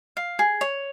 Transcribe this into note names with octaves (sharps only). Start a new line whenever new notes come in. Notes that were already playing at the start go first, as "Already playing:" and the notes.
F5
G#4
C#5